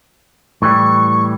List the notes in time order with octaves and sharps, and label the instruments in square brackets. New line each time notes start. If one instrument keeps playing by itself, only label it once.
[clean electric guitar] A2 E3 G3 [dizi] C#6